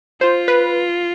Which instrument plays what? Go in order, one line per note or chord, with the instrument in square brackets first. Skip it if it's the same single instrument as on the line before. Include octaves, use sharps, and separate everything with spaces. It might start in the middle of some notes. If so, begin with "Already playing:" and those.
[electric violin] F4 [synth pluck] C5
[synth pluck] B4